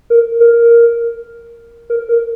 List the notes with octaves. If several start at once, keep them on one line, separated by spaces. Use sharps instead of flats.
A#4
A#4
A#4
A#4